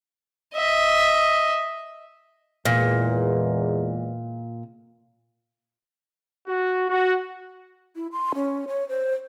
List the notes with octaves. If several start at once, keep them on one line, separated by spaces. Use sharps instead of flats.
D#5 E5
E2 A#2 E3 G#3
F#4
F#4
E4
C6
C#4
C#5
C5